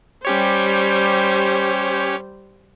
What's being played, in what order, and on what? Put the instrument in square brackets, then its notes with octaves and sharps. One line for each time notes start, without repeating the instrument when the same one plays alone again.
[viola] G3 C5 [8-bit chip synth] C#4 G4 C#5